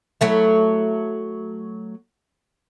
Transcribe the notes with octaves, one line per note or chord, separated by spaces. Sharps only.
F#3 A3 E4